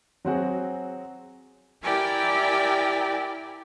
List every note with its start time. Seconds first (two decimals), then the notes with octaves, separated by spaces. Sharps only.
0.25 F#3 C4 F#4 G#4
1.83 E4 G4 A#4 D5 G5 G#5